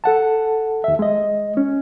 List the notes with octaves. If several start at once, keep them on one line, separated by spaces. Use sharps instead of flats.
A4 F#5 A5
D#2 E5
G#3 D#5
C#4